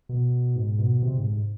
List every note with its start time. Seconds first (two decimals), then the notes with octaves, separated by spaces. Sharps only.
0.09 B2
0.55 G#2
0.79 B2
1.02 C3
1.18 G#2